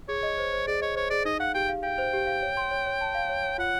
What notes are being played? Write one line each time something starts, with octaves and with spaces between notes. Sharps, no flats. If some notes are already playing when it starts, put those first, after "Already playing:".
G#4 C#5
D#5
C5
C5
G#4 D5
C#5 D#5
C5 C#5
G#4 D5
D#4 D#5
F5 F#5
G4 G5
F5
F5 G5
C5
G4
F5
C#5
C6
C#5
C#5
A5
F5
C#5
C#5
F4 F#5